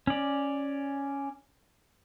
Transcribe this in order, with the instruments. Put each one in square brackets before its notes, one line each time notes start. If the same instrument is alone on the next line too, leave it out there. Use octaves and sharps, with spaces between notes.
[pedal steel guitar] C#4 D5